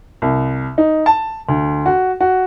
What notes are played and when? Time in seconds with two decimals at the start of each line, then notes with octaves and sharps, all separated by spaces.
0.22 C2
0.78 D#4
1.06 A5
1.49 D2
1.86 F#4
2.21 F#4